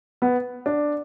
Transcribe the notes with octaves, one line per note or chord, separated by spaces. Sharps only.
B3
D4